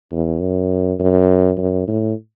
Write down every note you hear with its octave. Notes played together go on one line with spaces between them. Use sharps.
E2
F#2
F#2
F#2
A2